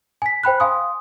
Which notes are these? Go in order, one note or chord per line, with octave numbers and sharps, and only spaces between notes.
G#5 B6
C5 G5 B5 F#6
F5 G#5 C6 D#6